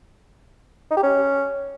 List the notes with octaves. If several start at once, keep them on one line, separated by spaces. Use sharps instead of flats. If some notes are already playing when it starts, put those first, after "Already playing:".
D#4
G4
C#4